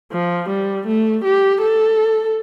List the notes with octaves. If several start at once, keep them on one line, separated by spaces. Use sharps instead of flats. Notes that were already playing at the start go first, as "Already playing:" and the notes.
F3
G3
A3
G4
A4